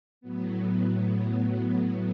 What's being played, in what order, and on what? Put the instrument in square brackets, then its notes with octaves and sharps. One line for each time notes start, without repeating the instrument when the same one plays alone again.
[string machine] A2 F#3 B3